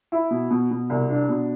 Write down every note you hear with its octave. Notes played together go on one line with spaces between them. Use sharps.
E4
B2
B2
B2
C2
D4
B2